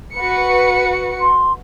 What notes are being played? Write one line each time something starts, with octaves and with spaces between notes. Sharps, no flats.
F#4 B4 C#7
C6